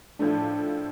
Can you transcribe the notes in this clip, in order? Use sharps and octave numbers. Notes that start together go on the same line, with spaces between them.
A2 F3 A3 D4